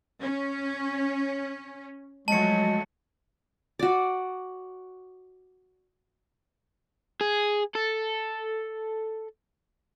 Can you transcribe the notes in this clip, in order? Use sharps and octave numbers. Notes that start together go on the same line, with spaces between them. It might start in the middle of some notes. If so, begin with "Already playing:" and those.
C#4
F3 F#3 G#3 A3 A5 C#7
F#4 D5
G#4
A4